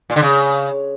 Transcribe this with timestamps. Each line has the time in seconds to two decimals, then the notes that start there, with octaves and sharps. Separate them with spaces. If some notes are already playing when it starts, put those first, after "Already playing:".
0.10 A#2
0.16 D3
0.22 C#3